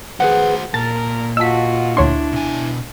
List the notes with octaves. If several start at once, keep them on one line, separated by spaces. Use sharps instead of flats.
F#4 G#4 B4 C5 F#5
A#2 A#4 A5 A6
F4 F#4 D#5 A5 E6 B6
D2 D4 E4 C#5 C6
B2 G#5